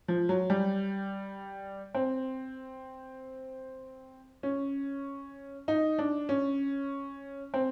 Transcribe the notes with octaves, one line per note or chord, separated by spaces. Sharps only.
F3
F#3
G3
C4
C#4
D#4
D4
C#4
C4